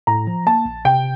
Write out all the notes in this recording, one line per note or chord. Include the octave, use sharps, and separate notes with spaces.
A2 A#5
F3
A#3 A5
A#1
C3 G5